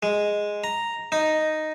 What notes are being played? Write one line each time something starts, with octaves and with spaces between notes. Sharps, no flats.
G#3
A#5
D#4